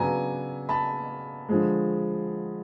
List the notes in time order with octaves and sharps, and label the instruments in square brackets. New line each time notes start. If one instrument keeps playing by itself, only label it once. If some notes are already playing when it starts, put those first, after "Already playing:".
Already playing: [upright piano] C#3 F#3 B3 D4 G#5 A#5
A5 B5
D3 F3 G#3